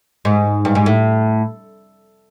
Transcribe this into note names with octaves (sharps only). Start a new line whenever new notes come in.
G#2
G2
G#2
A2